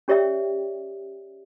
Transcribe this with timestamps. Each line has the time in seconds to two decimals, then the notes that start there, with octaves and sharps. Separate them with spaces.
0.08 C#4 G4 C#5 D5 E5 G5